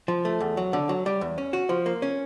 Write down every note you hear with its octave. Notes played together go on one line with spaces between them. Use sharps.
F3
A3
E2
F#3
D3
F#3
G3
E2
C#4
F#4
F3
A#3
C#4